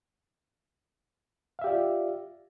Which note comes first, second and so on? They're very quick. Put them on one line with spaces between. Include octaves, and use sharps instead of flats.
F5 E5 G4 D5 F4